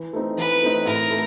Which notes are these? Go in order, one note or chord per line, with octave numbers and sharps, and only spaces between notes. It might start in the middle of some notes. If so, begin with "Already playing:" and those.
Already playing: E3
A3 C4 D#4
E3 B4
A3 C4 D#4
A2 A#4
A3